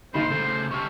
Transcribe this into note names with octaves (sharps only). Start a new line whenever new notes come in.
G#1 A#2 D#4 C5 B5
C#3 A3 A4
G3 A4 C#6 F6